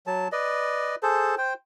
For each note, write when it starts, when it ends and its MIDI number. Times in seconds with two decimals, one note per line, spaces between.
0.07 0.28 54
0.07 0.28 81
0.32 0.95 71
0.32 0.95 74
0.32 0.95 75
1.03 1.35 68
1.03 1.35 69
1.03 1.35 72
1.03 1.35 81
1.38 1.54 72
1.38 1.54 79